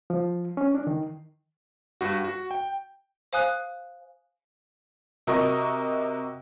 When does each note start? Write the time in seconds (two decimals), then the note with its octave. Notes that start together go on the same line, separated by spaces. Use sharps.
0.10 F3
0.57 C#4
0.75 D4
0.87 D#3
2.01 G2 F#4
2.25 F#4
2.51 G5
3.33 C5 F5 G#5 D#6 F#6
5.27 C3 F#4 A#4 D#5 C#6